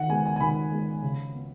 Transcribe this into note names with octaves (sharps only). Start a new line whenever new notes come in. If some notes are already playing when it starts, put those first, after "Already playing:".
Already playing: D#3 F#5
G#3 B3 G#5
G#5
G#5
D#3 B5
G#3 B3
C#3
B3